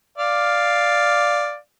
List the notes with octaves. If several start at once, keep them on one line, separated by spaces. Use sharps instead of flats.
D5 F5